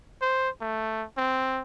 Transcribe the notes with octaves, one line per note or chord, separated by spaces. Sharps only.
C5
A3
C4